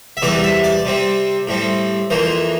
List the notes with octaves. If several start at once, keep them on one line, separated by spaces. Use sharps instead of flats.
E5
E2 C3 E3 G3 D5
E5
D5
C3 G3 C4
A2 G3 C4
F2 E3 A#3 C5